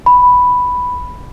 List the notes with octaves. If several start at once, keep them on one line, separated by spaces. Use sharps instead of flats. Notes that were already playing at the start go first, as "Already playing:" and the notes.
B5